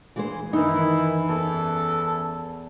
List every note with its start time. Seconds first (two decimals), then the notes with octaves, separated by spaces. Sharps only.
0.16 E3 G#3 C5
0.53 F#2 D#3 E3 D#4 E4
1.29 E2 A4